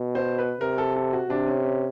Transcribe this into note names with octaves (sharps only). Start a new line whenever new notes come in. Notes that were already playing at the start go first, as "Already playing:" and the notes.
Already playing: B2
C5
B4
C3 A#4
A4
A4
F#4
C3 D4
C#4
C#4